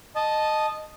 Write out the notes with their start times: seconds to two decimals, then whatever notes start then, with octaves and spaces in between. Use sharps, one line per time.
0.16 D#5 A5